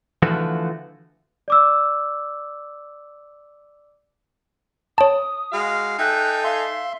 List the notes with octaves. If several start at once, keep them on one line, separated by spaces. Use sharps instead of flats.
D3 E3 F3 A3 F4 F#4
D5 D6 E6
C#5 A5 D#6
G#3 F#4 F5
D#4 A4 E5 G5 G#5 F#6
E5 F5 C6